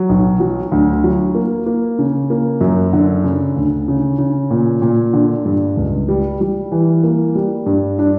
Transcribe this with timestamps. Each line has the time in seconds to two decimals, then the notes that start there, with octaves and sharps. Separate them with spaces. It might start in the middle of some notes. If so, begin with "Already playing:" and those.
Already playing: F#3
0.09 B1
0.40 F#3
0.72 D2
1.04 F#3
1.35 A#3
1.66 A#3
1.99 C#3
2.30 A#3
2.61 F#2
2.93 D3
3.24 C#3
3.56 D2
3.88 C#3
4.19 C#3
4.51 A#2
4.82 A#2
5.13 D3
5.45 G2
5.77 C#2
6.08 G3
6.41 G3
6.72 E3
7.03 A#3
7.35 G3
7.66 G2
7.99 D4